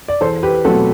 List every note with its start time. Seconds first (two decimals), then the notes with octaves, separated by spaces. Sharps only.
0.08 D5
0.21 E2 A4 C5
0.43 G4 B4
0.65 B2 F#3 A3 C4 F#4 A4